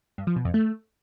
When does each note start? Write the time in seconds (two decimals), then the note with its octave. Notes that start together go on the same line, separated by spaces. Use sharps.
0.18 G2
0.27 F3
0.36 B2
0.45 F2
0.54 A3